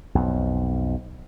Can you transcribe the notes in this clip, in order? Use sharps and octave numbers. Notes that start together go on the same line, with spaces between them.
B1 F2